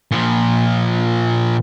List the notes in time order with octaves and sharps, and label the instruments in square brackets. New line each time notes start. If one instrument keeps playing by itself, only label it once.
[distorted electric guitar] A#2 F3